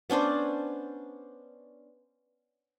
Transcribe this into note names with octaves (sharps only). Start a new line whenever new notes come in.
B3 C#4 D4 C5